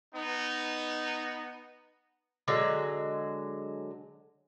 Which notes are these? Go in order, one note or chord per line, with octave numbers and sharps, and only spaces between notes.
B3 D#4
D3 F#3 G#3